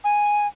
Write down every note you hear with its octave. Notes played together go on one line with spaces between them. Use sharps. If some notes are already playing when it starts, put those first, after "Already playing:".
G#5